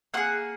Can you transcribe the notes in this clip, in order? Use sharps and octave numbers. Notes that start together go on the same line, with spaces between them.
A#3 F4 G#4 F#5